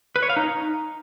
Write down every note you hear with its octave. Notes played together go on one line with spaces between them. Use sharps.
B4
C#5
F5
D#4